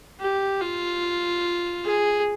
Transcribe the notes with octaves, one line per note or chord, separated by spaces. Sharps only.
G4
F4
G#4